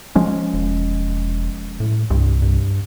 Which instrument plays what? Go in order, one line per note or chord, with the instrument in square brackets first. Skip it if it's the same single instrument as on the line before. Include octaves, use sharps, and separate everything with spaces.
[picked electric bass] F3 G#3 C#4
[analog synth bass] E1
A2
[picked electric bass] C2 [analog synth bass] G2
[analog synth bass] G2